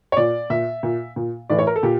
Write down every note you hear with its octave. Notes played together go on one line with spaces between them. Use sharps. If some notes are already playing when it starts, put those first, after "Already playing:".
C#5
A#2 D5
A#2 E5
A#2
A#2
A2 E3 D5
C#5
A#4
A4
A#2 G4